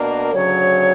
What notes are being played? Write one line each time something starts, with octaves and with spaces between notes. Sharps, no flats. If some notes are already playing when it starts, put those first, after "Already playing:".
Already playing: B2 A#3 D4 A#4
D2 C#3 F#3 C#5